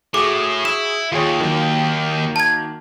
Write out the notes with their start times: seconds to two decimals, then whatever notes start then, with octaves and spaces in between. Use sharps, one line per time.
0.14 A2 F#4 G#4 D6
0.65 E4 E7
1.12 D#2 F4 G#4 C#5
1.40 D#3 F#3 A#3
2.36 A5 G#6